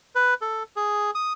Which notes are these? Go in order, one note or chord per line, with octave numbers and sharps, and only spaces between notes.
B4
A4
G#4
D#6